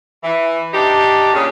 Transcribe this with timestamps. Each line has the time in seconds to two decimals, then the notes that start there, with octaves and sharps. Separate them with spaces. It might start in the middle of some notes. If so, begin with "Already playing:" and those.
0.24 E3
0.74 D4 D#4 G4
1.34 A#2 C#3